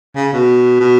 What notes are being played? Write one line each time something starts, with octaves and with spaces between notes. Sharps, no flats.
C#3
B2
B2